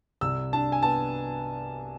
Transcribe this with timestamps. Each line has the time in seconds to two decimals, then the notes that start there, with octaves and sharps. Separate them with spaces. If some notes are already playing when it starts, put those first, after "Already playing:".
0.21 C2 E6
0.53 D4 A5
0.72 G#5
0.83 B3 A5